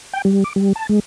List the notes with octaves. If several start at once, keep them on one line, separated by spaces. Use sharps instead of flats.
G5
G3
D6
G3
A5
G#3